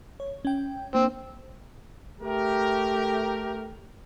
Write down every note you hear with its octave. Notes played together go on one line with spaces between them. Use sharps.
C#5
C#4 G5
A#3 C4 D4
A3 G4 A#4